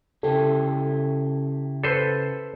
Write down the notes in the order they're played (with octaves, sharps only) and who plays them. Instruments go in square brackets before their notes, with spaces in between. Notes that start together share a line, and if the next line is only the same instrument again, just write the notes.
[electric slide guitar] C#3 E4 G4 [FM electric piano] A4
[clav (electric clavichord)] A4 B4 C5